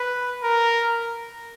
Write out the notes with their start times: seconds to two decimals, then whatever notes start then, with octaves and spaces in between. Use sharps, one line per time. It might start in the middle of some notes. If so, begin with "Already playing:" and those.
Already playing: B4
0.44 A#4